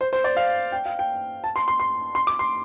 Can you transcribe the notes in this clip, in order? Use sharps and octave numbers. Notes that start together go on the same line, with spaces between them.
C5
C5
D5
F5
G5
F5
G5
A5
C6
C6
C6
C6
D6
C6